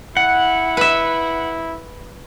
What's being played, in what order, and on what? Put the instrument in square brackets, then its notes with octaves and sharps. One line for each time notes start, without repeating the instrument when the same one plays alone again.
[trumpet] E4 [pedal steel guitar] F#5
[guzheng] B4 E5